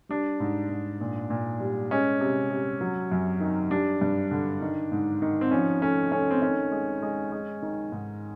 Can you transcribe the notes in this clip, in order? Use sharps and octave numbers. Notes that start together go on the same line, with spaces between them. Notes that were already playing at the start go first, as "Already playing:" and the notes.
G3 D4
G#2
G#2
A#2
A#2
G3
G#3 C#4
C3
C3
F#3
F#2
D#3
G3 D4
G2
D3
D#3
G#2
D#3
C4
F3 C#4
A3 C#4
A3 C#4
C4
D#3 C#4
G#3
G#3
G#3
D#3
G#2